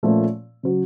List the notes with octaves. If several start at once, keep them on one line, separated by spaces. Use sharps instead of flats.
A#2 F3 A3 C#4
C#3 F#3